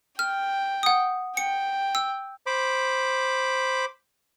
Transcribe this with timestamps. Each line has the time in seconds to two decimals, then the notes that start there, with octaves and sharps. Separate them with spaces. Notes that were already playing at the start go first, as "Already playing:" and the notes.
0.19 G5 F6
0.83 F#5 D#6
1.37 G5 C#7
1.95 E6
2.46 C5 B5 D6